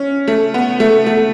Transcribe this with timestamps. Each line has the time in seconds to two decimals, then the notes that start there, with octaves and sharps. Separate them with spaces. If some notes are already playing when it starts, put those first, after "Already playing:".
Already playing: C#4
0.28 A3
0.54 B3
0.80 A3
1.06 A3